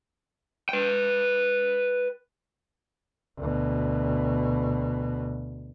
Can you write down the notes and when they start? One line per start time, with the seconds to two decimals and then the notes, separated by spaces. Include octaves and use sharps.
0.69 B4 G5
3.38 D2 B2